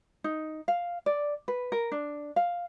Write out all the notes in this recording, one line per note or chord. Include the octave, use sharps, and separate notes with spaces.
D#4
F5
D5
B4
A#4
D4
F5